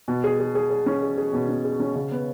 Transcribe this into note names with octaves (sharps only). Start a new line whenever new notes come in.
B2
G#4
G#4
G#4
G#4
C#4
G#4
G#4
B2
C#4
G#4
C#4
C#3
B3